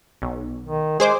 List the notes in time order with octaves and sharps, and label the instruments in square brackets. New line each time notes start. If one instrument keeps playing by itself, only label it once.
[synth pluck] B1
[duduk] D#3
[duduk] G#3 [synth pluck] G#4 C5 D6